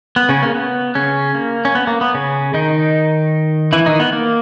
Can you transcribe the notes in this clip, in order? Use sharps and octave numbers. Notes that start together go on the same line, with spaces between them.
B3
C#3 C#4
A#3
B3
C#3 C#4
A#3
C#4
B3
A#3
B3
C#3 C#4
D#3 D#4
E3 E4
D#3 D#4
B3
A#3